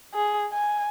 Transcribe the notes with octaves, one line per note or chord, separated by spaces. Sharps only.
G#4
G#5